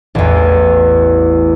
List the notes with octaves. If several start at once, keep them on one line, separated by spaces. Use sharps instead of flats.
A1 E2